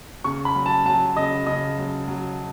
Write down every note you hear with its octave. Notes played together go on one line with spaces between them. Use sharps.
C#3 C#6
B5
F#3
A5
F#3 A5
C#3 D#5
C#3 D#5
F#3
F#3